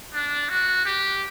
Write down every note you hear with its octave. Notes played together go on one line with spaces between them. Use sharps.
D4
F#4
G4